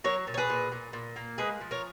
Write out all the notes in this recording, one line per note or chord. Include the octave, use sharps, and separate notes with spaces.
F#3 A#4 C#5
A#2
C#5
G#4 B4
A#2
A#2
A#2
A#3
G#3 G#4 B4
F3
A#4 C#5